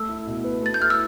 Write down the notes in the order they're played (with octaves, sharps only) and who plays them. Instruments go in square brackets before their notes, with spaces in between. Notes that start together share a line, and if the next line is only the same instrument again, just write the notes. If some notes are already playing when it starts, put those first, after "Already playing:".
Already playing: [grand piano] A3 [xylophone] E6
[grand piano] E4
B2
B4
[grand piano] A3 [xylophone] A6
[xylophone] G6
[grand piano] E4 [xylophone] F6
[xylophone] E6